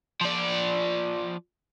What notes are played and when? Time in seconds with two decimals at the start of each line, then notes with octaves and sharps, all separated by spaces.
0.21 F3 D5